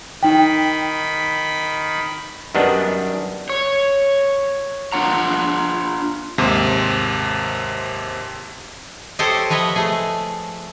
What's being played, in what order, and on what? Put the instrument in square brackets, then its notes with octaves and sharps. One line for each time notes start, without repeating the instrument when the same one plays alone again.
[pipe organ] D#3 B5 [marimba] D#4 G5
[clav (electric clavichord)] F#2 D#3 G3 B3 D4
[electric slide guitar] C#5
D4 F4 F#5 A#5
[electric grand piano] D#2 G#2 C3
[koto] G4 A4 C5 C#5 D#5
F3 B4 C#5 D#5 E5
A3 G#4